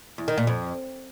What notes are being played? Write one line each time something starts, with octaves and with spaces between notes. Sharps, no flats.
E2
D#3
A#2
F2